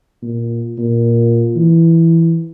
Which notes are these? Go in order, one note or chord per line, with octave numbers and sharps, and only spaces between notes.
A#2
A#2
E3